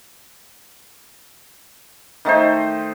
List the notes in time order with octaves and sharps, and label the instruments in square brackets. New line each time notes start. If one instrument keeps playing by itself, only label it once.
[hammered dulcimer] D#3 A3 D#4 C5